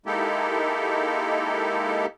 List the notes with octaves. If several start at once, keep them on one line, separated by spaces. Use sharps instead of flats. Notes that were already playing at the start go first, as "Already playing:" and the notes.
G#3 A#3 D#4 E4 G4 A4